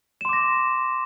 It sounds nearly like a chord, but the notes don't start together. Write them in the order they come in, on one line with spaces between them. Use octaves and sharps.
E7 C6 D6 A#6